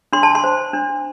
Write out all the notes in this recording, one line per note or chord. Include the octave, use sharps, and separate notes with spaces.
D4 C6
A5
C6
C5
D4